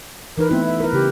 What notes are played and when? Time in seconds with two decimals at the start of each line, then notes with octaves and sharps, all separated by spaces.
0.38 E3 D#4 A#4 B4
0.51 A3 B3 C4 E4
0.65 E5
0.80 A#4 B4
0.93 C#3 G4